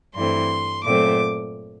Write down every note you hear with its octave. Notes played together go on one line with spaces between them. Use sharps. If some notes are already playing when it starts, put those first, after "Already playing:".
G2 E3 A3 C4 C6
A#2 F#3 A3 C4 D6